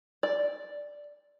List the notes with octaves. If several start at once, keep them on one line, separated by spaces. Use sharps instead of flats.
D5